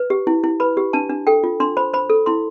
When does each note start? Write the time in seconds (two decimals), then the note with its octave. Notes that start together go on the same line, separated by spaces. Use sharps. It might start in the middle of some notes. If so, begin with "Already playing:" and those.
Already playing: B4
0.10 G4
0.27 E4
0.44 E4
0.60 B4 B5
0.77 G4
0.93 D4 A5
1.10 D4
1.27 A4 G5
1.44 F4
1.60 D4 C6
1.77 C5 B5
1.94 C5 B5
2.10 A4
2.26 E4 C6